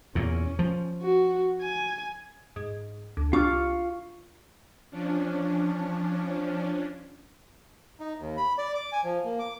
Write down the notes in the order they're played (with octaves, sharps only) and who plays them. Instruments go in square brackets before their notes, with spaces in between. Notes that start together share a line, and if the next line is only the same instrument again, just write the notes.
[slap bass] E2 A#2 [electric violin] C#4
[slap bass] F3
[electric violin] F#4
G#5
[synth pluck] G#2
D2
[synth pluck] C2 D4 [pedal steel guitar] F4 C#6 F6
[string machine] F3 C#4 D4
[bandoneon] D#4
D#2
B5
D5
D6
G#5
F3
A#3
D6